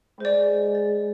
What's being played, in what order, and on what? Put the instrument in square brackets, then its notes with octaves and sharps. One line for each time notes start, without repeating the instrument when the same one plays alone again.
[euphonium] G#3 [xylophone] C5 D5
[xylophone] A6